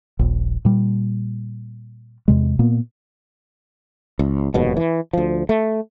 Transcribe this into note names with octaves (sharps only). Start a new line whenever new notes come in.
D#1 A#1
A#2 G3
E2 C3 G#3
A#2 A#3 B3
C#2
F1 D#2 G#2 B2
E3
D2 F3
A3